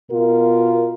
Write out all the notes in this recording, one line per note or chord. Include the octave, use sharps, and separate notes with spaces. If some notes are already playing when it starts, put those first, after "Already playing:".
B2 F4 A#4